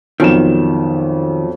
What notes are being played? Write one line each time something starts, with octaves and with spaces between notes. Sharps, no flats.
B1 F2 D#3 E7